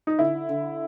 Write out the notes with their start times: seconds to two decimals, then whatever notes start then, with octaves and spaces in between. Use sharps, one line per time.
0.07 D#4
0.19 D3 E4
0.49 D3